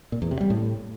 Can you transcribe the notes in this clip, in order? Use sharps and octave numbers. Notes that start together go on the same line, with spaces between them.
A#2
E2
C3
G3
A2